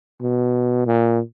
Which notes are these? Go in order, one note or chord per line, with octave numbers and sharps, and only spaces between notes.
B2
A#2